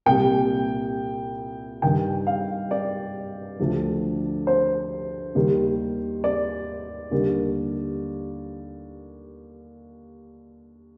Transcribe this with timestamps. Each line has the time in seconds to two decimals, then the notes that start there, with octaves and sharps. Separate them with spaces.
0.06 C2 A#2 G3 G5
1.82 G2 D#3 G3 G5
2.27 F5
2.71 D5
3.59 D2 D3 F3
4.47 C5
5.35 D#2 D#3 G3
6.24 D5
7.11 D#2 D3 G3